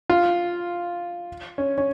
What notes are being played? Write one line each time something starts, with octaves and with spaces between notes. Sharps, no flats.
F4
C#4
C#4